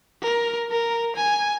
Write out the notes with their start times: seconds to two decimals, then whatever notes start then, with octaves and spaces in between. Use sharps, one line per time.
0.22 A#4
0.71 A#4
1.16 G#5